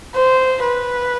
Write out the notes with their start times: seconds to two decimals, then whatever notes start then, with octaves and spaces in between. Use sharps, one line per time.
0.16 C5
0.63 B4